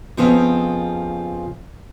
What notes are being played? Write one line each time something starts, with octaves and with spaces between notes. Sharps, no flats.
F2 C#3 F3 B3